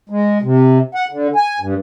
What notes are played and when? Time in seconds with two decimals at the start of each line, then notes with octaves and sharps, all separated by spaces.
0.09 G#3
0.42 C3
0.95 F#5
1.11 D3
1.35 G#5
1.60 G2